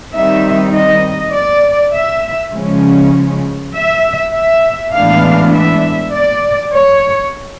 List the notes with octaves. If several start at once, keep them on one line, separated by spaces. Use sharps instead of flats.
D#3 G3 C4 D#4 E5
D#5
D5
E5
C#3 F3 G#3 C#4
E5
E5
A2 E3 G#3 B3 D4 F5
E5
D5
C#5